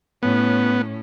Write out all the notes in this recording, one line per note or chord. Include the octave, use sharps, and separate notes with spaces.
A2 B3 C#4